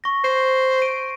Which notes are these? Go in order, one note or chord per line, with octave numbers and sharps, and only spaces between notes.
C#6 A#6
C5 C7
D7 D#7